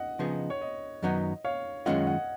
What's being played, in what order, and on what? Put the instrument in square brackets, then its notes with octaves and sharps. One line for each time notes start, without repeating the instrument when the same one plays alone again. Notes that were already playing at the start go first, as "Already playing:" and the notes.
Already playing: [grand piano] D#5 F#5
[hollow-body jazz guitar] C#3 F3 B3 D#4 G#4 [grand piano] D#5
[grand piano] C#5
D#5
[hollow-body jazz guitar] F#2 D#3 F#3 B3 D#4 [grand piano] D#5
[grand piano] C#5 F5
[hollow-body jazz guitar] F#2 D#3 G#3 C#4 F4 [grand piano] D#5 F#5
[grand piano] D#5 F#5